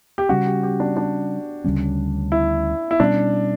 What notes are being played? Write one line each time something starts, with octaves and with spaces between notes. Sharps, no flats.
G4
C#3 G3 C#4 F#4
G4
G4
D4
D4
D2 C#3 G3 C#4
E4
E4
B2 G3 C#4 D4